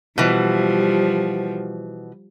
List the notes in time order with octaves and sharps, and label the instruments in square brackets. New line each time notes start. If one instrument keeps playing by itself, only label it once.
[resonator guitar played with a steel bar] B2 E3 [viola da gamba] F3 G3